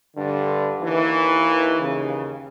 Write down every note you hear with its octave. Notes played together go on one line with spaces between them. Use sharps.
G2 D3
D#2 E3
D#2 C#3